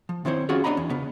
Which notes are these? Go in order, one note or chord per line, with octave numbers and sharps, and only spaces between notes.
F3
D#3 C4 E4 C5 C#5
B3 C#4 F4 F#4 G#4 C#5
B3 D4 C#5 D#5 A#5 B5
E2
C#3 B3